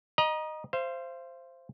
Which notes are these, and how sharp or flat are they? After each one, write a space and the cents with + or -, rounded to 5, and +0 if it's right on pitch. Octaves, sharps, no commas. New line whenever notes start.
D#5 -10 A#5 +30
C5 +0 F5 -40